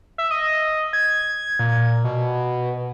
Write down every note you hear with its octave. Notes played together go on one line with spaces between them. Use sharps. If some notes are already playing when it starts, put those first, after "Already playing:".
E5
D#5
G#6
A#2
B2